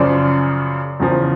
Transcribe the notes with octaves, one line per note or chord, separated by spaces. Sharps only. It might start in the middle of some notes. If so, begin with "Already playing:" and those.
Already playing: F#2 C#3 F3 D5
E2 C#3 F3